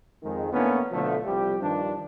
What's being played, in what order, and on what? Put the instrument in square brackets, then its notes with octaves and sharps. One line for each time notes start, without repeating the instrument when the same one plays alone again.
[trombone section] F2 D#3 G#3
A2 A#3 B3 C#4 D4 E4
B2 D3 F3 A3
C2 F3 G3 G4
G2 D#3 F3 D4